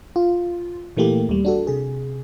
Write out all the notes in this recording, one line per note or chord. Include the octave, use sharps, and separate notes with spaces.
F4
A#2 E3 A3 A#3 G4
D#2 G3
D4 F#4 A4
C3 G#4